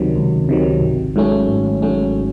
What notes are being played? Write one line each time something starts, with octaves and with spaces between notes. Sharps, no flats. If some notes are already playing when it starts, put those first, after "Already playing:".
Already playing: C#2 C3 D#3 F#3
C#2
C3 D#3 F#3
G#1
G#2 F#3 A3 C#4
G#1
G#2 F#3 A3 C#4